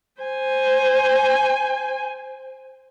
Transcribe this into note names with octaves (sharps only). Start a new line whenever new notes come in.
C5 G#5